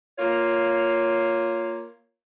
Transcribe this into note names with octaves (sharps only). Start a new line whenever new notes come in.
A#3 F4 C#5